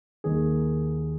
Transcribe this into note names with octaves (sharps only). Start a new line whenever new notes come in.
D#2 D#3 A#3 G#4